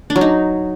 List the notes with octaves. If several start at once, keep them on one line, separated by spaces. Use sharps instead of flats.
D4
F#3
D#4